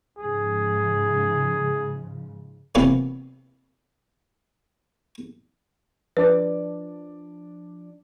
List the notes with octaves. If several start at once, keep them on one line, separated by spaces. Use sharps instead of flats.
G#2 C#3 F3 G#4
C3 D#3 E3 F#3 A#3 B3
F3 D4 B4 D5